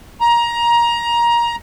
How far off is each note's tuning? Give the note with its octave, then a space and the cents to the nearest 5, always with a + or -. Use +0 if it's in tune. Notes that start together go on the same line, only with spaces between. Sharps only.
A#5 +20